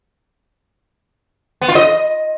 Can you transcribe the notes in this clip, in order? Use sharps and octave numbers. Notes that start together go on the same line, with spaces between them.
B3
F4
D#5